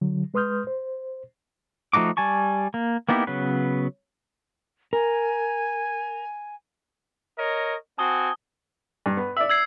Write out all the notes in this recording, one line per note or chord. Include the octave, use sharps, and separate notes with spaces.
D3 F#3
G#3 B4 C6 D#6 F6 G6
C5
F3 A3 D#4 F#4 D6
G3 G#5 A5 C#6
A#3
A#3 B3 D#4 E4 G4
C#3 F#3 B3 B4
A#4 G#5
A#4 C#5 D#5
C4 F#4 G#5 A5 D#6 G7
G2
B3
D5 E5 E6
E6 G#6 C7